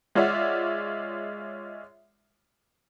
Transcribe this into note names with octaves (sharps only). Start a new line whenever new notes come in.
G#3 F4 C#5 D5 E5 F#5